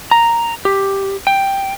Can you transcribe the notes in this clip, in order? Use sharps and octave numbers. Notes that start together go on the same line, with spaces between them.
A#5
G4
G5